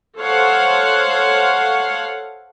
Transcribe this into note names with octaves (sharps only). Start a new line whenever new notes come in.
A4 C5 C#5 F5 F#5